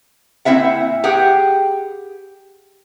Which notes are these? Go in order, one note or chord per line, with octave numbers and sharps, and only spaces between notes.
A#2 C4 E4 E5 F#5
G4 G#4 F#5 G5